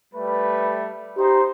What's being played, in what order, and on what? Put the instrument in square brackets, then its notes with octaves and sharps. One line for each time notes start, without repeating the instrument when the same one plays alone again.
[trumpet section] G3 A3 B4
[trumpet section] D#4 C5 C6 [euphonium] G4